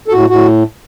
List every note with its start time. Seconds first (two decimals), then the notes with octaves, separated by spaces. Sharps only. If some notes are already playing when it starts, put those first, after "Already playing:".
0.08 A4
0.12 A2 F#4
0.30 A2 F#4